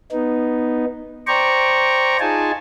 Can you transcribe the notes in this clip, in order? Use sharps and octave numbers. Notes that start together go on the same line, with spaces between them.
B3 D#4
C5 D5 G5 A#5 C#6
D#4 F4 G#4 G#5 A5